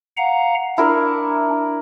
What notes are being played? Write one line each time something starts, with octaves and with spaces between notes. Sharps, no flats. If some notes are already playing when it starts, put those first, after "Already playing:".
F5 F#5 A#5
D4 E4 A#4 D5